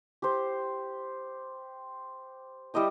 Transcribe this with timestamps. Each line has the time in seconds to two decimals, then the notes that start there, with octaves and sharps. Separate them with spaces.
0.22 G4 C5
2.74 G3 E4 D#5 G5